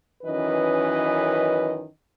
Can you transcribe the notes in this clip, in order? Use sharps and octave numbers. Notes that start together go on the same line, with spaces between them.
F#2 D#3 E3 C#4 B4 D#5